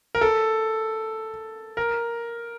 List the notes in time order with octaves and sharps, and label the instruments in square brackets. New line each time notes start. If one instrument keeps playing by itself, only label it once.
[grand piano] A#4
A4
A#4